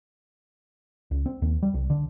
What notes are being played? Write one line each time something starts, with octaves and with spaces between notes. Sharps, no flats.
C#2
C4
D#2
G3
C2
D3